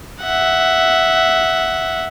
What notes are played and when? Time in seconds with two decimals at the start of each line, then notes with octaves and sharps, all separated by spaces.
0.23 E5 F#5